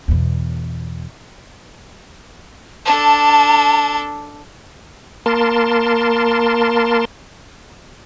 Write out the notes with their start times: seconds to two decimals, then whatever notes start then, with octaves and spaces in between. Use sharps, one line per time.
0.08 E2 B2
2.86 D4 A4 A5
5.26 A#3 A#4 A5 C6